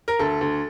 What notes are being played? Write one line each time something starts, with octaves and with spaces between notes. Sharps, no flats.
A#4
D2 A4
D2